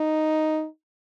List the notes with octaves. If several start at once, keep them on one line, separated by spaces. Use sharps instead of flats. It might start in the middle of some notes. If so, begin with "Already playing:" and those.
Already playing: D#4